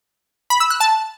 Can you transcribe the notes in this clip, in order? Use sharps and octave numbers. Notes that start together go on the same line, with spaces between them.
B5
E6
F#6
A5